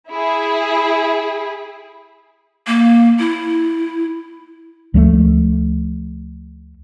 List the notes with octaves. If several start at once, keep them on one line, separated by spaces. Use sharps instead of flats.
E4 G#4
A#3
E4
D2 F3 F#3 A3